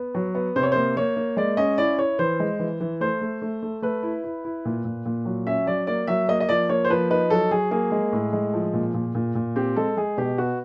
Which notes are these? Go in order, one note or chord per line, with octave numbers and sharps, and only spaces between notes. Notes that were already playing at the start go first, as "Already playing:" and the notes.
Already playing: B3
F#3
B3
C3 C5
C#5
A#3 C5
A#3 C#5
A#3
G#3 D5
C#4 D#5
E4 D5
E4 C#5
E3 C5
G#3
E3
E3
A3 C5
A3
A3
A3
A3 B4
E4
E4
E4
A#2
A#2
A#2
F#3
C#4 E5
F#3 D5
A#3 D5
F#3 E5
A#3 D#5
D#5
F3 D5
A#3 C#5
C5
F3 B4
D#4 B4
F#3 A4
F#3 G#4
A#3 G#4
G#3
A2
G#3
F3
A#2
A#2
A#2
A#2
C4 G4
G#3 A4
G#3 G#4
B2 G4
B3 F#4